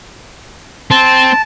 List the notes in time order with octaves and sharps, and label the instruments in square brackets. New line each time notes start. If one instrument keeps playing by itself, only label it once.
[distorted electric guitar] C4 [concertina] A5